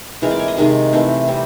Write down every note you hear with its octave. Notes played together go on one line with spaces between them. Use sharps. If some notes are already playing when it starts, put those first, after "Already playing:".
E3 G#3 C4 A#4
D5
C#5
D#5
C3 D#3 G#3
E3 A3 C4
G3 C4